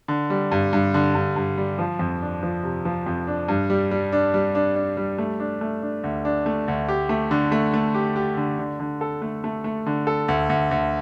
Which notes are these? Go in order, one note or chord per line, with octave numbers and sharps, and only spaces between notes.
D3
G3
G2
G2
D3
G2
G2
G3
F3
F2
D4
F3
C3
F3
F2
D4
G2
G3
G3
D4
G3
D4
D4
G3
A3
D4
A3
D4
D2
D4
A3
D2
G4
A3
D3
A3
A3
G4
G4
D3
D3
D3
A4
A3
A3
A3
D3
A4
D2
D2
D2